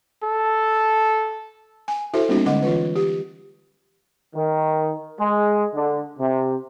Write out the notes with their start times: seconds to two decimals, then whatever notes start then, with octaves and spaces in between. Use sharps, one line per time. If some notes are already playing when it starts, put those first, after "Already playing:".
0.24 A4
1.88 G#5
2.14 E4 F#4 A4 C5 E5
2.29 G3 A#3 B3 C#4 D#4 F#4
2.46 D3 G#3 D#5 F#5 D6
2.62 E3 F4 B4
2.96 G4
4.35 D#3
5.19 G#3
5.74 D3
6.19 C3